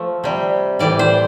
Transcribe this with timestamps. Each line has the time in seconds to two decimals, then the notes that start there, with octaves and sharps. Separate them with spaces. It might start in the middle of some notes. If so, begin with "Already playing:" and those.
Already playing: F3 A3
0.24 C3 G3
0.79 A2 E3 G3 D5
0.99 C5